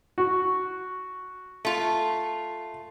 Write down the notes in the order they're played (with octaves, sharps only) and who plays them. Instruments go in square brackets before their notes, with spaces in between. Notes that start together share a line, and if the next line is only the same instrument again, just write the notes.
[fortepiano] F#4
[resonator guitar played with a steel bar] A3 F4